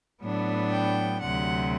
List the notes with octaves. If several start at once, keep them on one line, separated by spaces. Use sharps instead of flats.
A2 F#3 B3 D4
G5
D2 C3 F#3 F#5